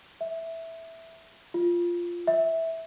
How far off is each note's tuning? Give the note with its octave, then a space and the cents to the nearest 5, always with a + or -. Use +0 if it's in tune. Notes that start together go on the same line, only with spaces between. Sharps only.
E5 -5
F4 -5
E5 -15